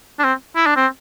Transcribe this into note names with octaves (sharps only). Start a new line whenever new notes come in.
D4
C4
E4
D4
C4